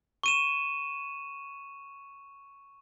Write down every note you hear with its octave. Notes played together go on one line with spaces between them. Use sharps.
C#6 D#7 E7